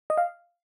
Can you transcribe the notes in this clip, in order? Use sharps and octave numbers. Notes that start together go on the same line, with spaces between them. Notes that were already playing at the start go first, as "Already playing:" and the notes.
D#5
F5